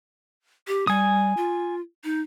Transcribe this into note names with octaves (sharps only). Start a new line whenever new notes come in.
G4
G3 G#5 D#6
F4
D#4